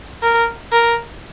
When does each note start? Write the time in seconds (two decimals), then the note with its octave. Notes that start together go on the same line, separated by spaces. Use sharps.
0.23 A#4
0.72 A#4